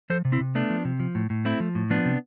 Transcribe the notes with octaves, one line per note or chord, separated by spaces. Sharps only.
F3 A4 C5
C3
C4 E4
C3
A3 B3 D4
F3
C3
F3
A2
A2
A3 C4 E4
F3
A2
F3 B3 D4
C3